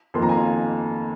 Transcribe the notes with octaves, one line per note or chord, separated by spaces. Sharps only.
F2 D#3 A#3 C6
A#5
G#5
F5 A#5